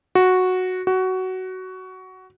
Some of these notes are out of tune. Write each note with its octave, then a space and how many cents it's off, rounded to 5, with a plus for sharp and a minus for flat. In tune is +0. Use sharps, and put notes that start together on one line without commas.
F#4 -5
F#4 +15